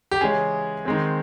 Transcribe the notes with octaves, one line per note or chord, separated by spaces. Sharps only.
G4
C#3 E3 G#3 C#4 G#4
D#3 G#3 C4